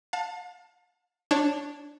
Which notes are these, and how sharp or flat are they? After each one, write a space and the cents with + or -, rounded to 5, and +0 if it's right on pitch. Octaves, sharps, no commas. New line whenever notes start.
F5 +40 A5 +15
D4 -5 C#5 -15